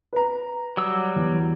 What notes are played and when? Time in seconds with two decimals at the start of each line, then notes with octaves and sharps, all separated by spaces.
0.13 B4 A#5
0.77 F#3 G3 E6
1.16 E2